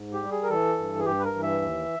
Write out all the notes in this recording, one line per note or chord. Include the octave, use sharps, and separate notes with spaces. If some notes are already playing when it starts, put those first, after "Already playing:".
Already playing: G#2
G4
G3
G#4
A#4
E3 A4
G2
G#4
G2 G4
B4
A#4
E3
E5
D#2